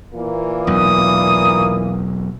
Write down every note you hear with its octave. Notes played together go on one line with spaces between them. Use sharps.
A#2 E3 A#3
B1 E2 D#6